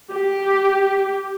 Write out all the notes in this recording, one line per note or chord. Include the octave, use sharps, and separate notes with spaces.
G4